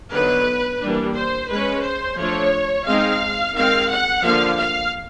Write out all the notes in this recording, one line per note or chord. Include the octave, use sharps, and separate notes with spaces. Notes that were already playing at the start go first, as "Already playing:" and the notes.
D3 F#3 B3 D#4 B4
E3 G3 A#3 D4
C5
G#3 C#4 B4
C5
F3 A3 D4 C#5
G#3 C4 D#4 F5
D#3 G#3 C4 F5
F#5
D3 F3 A#3 F5
F5